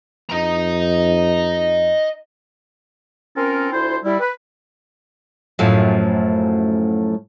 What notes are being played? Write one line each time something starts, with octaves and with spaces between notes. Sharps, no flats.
F2 D#5 A#5
C4 C#4 F4 A4 A#4
D2 E4 F4 C5
G3 E4
B4
F#2 A2 F3